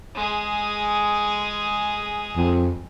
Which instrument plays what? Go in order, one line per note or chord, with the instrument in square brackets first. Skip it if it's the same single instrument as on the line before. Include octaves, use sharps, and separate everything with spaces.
[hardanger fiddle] G#3 G#4
[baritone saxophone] F2